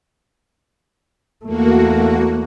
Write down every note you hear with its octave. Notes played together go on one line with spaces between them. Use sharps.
E2 A3 A#3 F#4